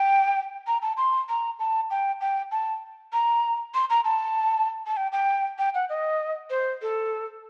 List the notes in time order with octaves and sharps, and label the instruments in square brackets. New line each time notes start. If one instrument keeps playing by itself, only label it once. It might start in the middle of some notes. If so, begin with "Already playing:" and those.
Already playing: [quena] G5
A#5
A5
C6
A#5
A5
G5
G5
A5
A#5
C6
A#5
A5
A5
G5
G5
G5
F#5
D#5
C5
A4